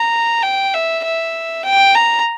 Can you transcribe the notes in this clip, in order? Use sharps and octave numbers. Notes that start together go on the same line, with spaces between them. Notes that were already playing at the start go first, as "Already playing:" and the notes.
Already playing: A#5
G5
E5
E5
G5
A#5